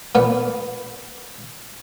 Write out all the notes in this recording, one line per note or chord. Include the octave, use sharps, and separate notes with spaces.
A#2 B3